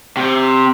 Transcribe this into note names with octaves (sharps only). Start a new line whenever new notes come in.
C3